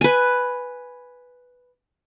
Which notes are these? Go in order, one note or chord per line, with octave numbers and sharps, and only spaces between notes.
B4 G#5